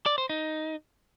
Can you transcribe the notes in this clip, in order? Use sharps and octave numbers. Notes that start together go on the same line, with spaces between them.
D5
C5
D#4